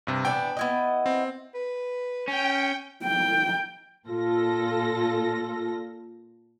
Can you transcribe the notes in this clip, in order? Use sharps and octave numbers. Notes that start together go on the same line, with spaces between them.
G2 C3
E3 B3 D4 G5
B3 E4 D#5
C4
B4
C#4 G5 G#5
G5
A#2 F4 A4 A#6